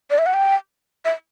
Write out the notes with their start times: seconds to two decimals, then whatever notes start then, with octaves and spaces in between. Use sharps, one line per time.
0.10 D5
0.18 E5
0.26 F#5
0.34 G5
1.05 E5